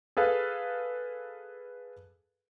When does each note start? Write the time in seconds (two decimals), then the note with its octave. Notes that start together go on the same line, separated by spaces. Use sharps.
0.17 G#4 A4 B4 F5